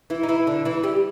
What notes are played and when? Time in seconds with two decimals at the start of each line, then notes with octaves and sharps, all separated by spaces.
0.10 E3 E4
0.23 D#4
0.29 E3 E4
0.47 D3 D4
0.65 E3 E4
0.83 G3 G4